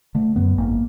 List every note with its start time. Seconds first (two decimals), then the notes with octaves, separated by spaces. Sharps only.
0.15 D3 A3
0.36 F#2 B3
0.58 G#1 A#3